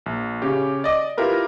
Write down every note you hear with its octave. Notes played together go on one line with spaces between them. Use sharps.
A#1
C#3 C#4 G4
D5 D#5 D6
E4 F4 G4 A#4 B4